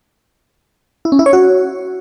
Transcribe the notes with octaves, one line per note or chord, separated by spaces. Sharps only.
E4
C#4
E4
C#5
F#4